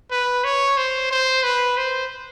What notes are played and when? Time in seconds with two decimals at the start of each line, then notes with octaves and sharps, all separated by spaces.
0.11 B4
0.44 C#5
0.77 C5
1.11 C5
1.43 B4
1.77 C5